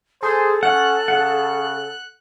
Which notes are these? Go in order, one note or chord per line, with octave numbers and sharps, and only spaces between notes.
G#4 A4 C5
C#4 F#5 F#6
C#3 F#5